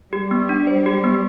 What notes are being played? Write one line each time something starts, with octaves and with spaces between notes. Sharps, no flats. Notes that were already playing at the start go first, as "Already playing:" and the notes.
G3 G4
B3
D4
C5
G4
B3